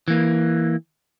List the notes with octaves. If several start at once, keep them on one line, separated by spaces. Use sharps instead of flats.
E3 A#3